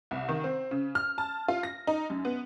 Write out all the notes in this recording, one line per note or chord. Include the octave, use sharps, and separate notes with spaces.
C2
D#3
C4
C#3
F6
A5
F4
A#6
D#4
F#2
B3